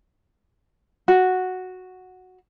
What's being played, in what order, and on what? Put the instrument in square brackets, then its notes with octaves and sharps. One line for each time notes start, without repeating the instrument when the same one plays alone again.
[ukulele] F#4